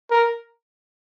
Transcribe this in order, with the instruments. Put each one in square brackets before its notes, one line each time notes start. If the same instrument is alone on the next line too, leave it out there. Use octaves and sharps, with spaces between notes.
[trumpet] A#4